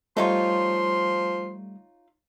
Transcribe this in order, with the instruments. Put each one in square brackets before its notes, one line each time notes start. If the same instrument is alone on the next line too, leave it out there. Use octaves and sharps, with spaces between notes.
[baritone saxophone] F3 [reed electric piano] G3 A3 [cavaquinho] D#4 F4 C#5 [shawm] C6